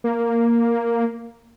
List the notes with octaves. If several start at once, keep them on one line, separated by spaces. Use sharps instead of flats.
A#3